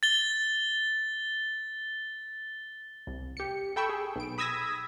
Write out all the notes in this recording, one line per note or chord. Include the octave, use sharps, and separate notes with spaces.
A6 G7
C2
G4 C#7
A4 G5 B5 C#6 E6
G#4
B1 D7
B5 D#6 E6 G#6 A#6 B6